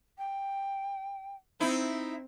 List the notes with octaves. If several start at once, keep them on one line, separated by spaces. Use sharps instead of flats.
G5
C4 D#4 E4 E5